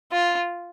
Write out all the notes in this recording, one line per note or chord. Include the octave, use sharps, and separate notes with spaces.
F4